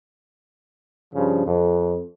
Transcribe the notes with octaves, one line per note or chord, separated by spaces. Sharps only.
G2 C#3 F3
F2